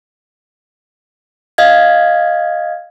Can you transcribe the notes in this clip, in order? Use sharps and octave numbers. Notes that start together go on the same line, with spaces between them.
D#5 F5 G#6